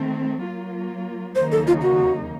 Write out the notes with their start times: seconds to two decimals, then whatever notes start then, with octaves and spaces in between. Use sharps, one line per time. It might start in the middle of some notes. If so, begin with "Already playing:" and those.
Already playing: D#3 A3 C4
0.41 F#3 A#3 F4
1.35 D#2 C#3 F#3 A#3 D#4 C5
1.52 A4
1.67 F4
1.82 F#4